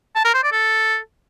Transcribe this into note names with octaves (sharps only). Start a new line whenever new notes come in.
A5
A#4
C5
D5
A4